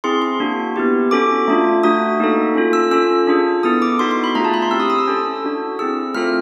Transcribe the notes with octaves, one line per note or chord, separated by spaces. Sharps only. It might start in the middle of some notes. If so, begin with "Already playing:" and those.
C4 E4 G#4 C6
C6
A#3 D4 F#4
B3 E4 G4
C#4 F#4 A4 D6
A3 D4 F4
A3 D4 F#4 D#6
A#3 D#4 F#4 A4
C#4 F4 A4
E6
C#4 F4 A4 E6
D4 F4 G#4
B3 E4 A4 D#6
D6
B3 D#4 F#4 A4 C6
C6
B5
A3 D4 F4 G#4 A#5
A5
B5
C6
C4 E4 G4 E6
D#6
D#6
E6
C#4 E4 A4
D4 F#4 A4
C4 E4 G#4 E6
A3 C4 F4 A4 F6